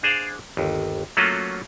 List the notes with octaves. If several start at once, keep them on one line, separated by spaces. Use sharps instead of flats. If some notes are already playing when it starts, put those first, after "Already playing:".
D4 G#4 C5 D5 F5
G1 D#2
F#3 A3 A#3 C#4 F4 F#4